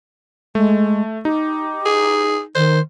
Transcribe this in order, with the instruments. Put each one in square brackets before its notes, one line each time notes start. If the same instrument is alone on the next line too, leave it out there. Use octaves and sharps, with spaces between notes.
[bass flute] G#3 [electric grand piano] A3
[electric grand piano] D#4 [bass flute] G4
[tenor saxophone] G#4
[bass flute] D#3 [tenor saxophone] C5